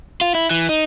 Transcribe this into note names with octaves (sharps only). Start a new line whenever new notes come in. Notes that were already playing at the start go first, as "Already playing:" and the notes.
F4
E4
E3
D#4